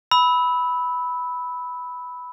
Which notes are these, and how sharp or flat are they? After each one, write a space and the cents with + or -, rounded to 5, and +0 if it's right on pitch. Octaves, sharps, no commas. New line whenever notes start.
B5 +0 E6 -25